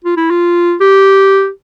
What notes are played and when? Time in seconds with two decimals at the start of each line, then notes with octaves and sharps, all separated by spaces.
0.05 F4
0.17 E4
0.31 F4
0.81 G4